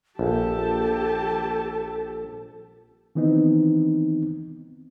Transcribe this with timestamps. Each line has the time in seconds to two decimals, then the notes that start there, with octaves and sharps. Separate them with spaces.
0.19 A#1 G4 A4 A5
3.15 D#3 E3 B3 C4 D#4